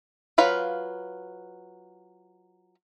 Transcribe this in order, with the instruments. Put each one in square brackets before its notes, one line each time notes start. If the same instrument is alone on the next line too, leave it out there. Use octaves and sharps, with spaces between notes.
[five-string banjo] F#3 F4 B4 F5